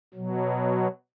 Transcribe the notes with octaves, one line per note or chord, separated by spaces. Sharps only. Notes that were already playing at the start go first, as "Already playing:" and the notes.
B2 F#3